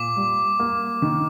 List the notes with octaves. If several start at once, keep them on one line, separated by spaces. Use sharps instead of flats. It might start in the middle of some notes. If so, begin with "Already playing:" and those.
Already playing: A#2 D6
G3
A#3
D#3